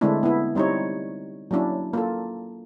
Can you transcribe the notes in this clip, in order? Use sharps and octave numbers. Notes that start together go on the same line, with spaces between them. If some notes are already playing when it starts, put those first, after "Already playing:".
D3 G#3 A3 C4 D4 E4
B3 E4
G3 C4 D#4 E4 C#5
F#3 A#3 C#4 D4 E4
A#3 F4 A4